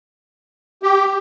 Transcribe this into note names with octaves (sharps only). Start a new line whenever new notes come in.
G4